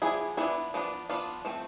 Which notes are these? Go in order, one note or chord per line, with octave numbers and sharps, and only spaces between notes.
F3 B3 D4 E4 G#4
F3 B3 D4 E4 G#4
F3 B3 D4
F3 B3 D4 F4
F3 A3 C4